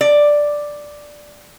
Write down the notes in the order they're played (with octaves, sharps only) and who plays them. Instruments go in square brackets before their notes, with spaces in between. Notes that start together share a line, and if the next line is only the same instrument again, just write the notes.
[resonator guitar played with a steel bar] D5